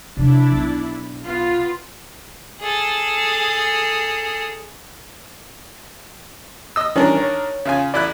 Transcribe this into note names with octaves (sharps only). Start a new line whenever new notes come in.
C3 F3 D4 E4
B1
B3 F4
G#4 A4
D#5 E6
D#3 E3 G3 C#4 D4 A#4
C#5
C#3 F4 G#5
A1 E4 D5 F#6